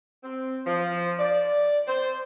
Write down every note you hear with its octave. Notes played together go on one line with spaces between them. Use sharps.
C4
F3
D5
C5